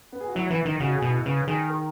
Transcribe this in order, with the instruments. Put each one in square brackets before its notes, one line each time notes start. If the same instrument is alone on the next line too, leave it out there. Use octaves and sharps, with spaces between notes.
[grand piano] B3
G#4
F#4
[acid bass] F#3 [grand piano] E4
[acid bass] E3 [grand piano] B3
[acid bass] D#3 [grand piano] D#4
[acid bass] C#3 [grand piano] F#4
[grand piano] G#4
[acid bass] B2
[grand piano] E4
[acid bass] C#3 [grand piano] B3
[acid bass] D#3 [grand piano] G#4
[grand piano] A#4